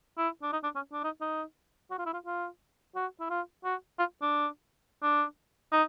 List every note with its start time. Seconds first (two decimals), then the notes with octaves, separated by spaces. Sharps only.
0.18 E4
0.43 D4
0.53 D#4
0.64 D4
0.76 C#4
0.93 D4
1.04 D#4
1.21 D#4
1.91 F#4
1.99 F4
2.06 E4
2.13 F4
2.26 F4
2.96 F#4
3.20 E4
3.30 F4
3.65 F#4
3.99 F4
4.23 D4
5.03 D4
5.73 D#4